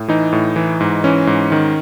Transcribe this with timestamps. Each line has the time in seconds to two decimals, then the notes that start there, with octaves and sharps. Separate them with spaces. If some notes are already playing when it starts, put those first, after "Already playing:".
Already playing: A2
0.08 E3 D#4
0.33 A2
0.56 E3
0.81 G#2
1.04 E3 C#4
1.27 G#2
1.52 D#3